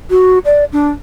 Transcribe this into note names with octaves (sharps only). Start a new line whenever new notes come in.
F#4
D5
D4